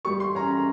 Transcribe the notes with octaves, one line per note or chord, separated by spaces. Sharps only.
G3 C#6
C6
C#4 A#5
A#5